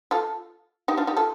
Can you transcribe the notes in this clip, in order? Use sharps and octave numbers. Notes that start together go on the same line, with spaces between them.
F4 A4
D#4 G4
D4 F4
D#4 G4
F4 A4